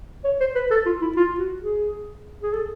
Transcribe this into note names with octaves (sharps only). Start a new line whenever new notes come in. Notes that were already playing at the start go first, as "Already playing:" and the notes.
C#5
C5
B4
A4
F4
E4
F4
F#4
G#4
G#4
A4